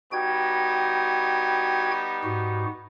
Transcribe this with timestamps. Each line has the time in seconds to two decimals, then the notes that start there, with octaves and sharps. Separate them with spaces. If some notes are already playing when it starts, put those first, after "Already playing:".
0.12 G3 B3 D#4 F#4 G5 G#6
2.24 G#2 F#4